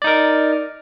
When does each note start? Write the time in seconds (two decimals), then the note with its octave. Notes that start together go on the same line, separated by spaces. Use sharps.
0.02 D5
0.04 D#4
0.07 A#4